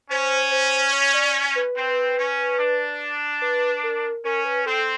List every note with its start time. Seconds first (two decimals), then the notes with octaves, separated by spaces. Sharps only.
0.10 C#4 C5
0.51 C5
0.92 C#5
1.14 D5
1.55 B4
1.76 C4
2.17 C#4
2.59 D4
3.42 B4
3.83 A#4
4.24 C#4 A#4
4.45 B4
4.66 C4 A4